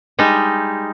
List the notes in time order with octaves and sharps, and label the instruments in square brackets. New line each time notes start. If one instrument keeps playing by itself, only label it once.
[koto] G3 G#3 D#4